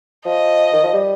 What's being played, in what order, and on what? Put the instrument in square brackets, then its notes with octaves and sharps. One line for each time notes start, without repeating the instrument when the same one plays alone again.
[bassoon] F3 [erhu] D#5
[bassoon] D#3
F3
G3